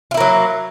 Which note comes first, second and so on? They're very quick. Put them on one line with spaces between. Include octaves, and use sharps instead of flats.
F4 E4 A#3 F#3